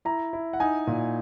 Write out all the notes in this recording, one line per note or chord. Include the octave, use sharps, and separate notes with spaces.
E4 A#5
E4
F#5
D#4 G#5
A#2